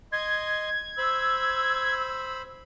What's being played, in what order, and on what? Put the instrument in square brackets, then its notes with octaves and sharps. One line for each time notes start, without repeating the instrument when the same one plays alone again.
[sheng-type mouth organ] D#5 C6 [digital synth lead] G#6
[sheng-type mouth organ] C5 B5 [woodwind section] E6